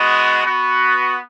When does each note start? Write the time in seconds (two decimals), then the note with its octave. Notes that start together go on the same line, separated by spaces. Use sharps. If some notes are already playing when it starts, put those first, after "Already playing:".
Already playing: G#3 B3 F#4
0.43 B3 F#4